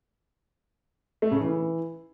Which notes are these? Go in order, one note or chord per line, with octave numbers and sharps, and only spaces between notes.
A3
C#3
E3